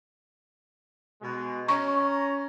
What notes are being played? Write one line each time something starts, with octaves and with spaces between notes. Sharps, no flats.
B2 G#3
C#4 A#5 C#6